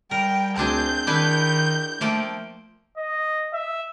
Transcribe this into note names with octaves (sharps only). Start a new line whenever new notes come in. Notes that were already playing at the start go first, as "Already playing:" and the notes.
G3 A#4 G5
D2 C4 D4 G#4 G6
D#3 D4 E4 B4
F3 A3 A#3 G5
D#5
E5